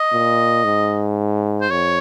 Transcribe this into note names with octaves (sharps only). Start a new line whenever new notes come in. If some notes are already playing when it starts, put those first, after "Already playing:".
Already playing: D#5
A#2
G#2
C5
F2 C#5